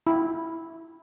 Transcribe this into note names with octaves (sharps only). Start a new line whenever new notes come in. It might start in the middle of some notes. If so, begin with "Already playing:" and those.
E4